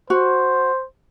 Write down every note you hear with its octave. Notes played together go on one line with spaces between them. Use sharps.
F#4 C5